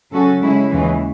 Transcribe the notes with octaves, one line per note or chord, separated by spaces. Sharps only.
C#3 F#3 C#4 F#4 A4
C#3 G#3 C#4 E4
D#2 C#3 E3 G#3